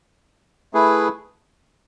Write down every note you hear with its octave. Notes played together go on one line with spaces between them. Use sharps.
A3 E4 G#4 B4